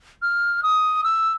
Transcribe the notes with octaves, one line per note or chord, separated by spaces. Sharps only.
F6
D#6
E6